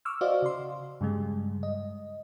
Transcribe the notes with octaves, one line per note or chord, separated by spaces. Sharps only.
C#6 D6 E6 F6
F#4 C5 D5 D#5 F5
C#3 C6
G2 C#3 G3 G#3
D#5